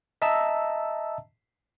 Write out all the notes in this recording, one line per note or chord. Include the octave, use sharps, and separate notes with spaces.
D#5 E5 A5 A#5 E6